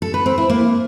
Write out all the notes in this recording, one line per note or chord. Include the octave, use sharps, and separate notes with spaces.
A4
B4
C4
E4
A#3